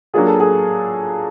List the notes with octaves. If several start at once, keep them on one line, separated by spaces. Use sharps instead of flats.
F#3 A#3 D4 F4 G#4
A4
G#4